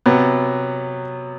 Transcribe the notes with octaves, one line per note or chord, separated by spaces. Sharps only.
C3 F#3 B3